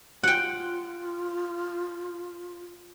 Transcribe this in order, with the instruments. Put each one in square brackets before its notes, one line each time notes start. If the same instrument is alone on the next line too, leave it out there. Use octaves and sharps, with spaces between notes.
[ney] F4 [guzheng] F#5 G5